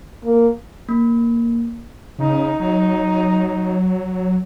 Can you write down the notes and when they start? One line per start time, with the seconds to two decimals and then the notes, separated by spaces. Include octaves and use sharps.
0.25 A#3
0.89 A#3
2.19 C#3 D#4
2.60 F#3 D#4